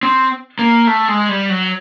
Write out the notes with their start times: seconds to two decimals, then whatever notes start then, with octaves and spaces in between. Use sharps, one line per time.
0.03 C4
0.59 A#3
0.87 A3
1.08 G#3
1.29 G3
1.50 F#3